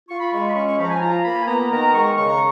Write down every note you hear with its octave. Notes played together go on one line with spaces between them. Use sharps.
F4 C#6
B5
G#3 C#6
B5
C#4 C#6
C#6
F3 B5
A#5
G#5
F4 A#5
A#3 B5
G#5
B3 A#5
D#3 A#5
G#3 C#6
C#3 C#6
A#5